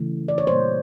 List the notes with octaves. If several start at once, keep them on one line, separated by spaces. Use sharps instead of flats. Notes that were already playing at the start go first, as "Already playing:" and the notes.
Already playing: C#3 E3 A3
D5
C#5
A#2 G3 A#3 C5